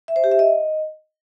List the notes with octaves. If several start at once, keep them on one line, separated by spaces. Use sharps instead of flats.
E5
C5
G4
E5
D#5